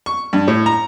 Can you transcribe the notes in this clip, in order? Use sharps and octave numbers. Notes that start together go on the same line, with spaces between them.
C#6
G2
A2
A#5